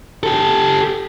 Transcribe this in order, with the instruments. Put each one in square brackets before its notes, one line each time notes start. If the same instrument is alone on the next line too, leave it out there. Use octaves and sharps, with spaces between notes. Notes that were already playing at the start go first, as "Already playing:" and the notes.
[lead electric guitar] G4 A4